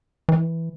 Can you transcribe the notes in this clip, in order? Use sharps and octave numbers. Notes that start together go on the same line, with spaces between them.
E3